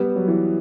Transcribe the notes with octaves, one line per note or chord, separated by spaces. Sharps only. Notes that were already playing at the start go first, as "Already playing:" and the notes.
Already playing: G3 B3
F#3
E3